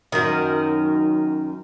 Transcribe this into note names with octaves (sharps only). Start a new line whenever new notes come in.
F#2 D#3